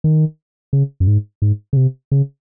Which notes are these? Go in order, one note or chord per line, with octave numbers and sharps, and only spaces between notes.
D#3
C#3
F#2
G#2
G#2
C#3
C3
C#3